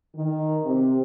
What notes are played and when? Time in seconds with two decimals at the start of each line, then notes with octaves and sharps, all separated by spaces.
0.16 D#3
0.65 C3